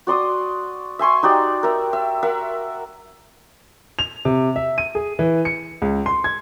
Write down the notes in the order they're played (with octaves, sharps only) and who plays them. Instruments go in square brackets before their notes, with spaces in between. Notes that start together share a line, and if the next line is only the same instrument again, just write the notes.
[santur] F#4 D5 C6 D#6
E5 G#5 C6 C#6
D#4 F#4 G4 D5
A#4 E5
E5
A#4 E5 F#5
[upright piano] F7
C3
E5
D#7
G#4
E3
C#7
C#2
C6
G#6